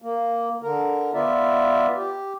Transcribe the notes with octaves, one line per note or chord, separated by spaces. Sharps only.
A#3
D3 A#4
B3 F4 D5 E5
G4